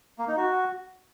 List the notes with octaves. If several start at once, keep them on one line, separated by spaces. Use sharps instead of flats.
A#3
D#4
F#4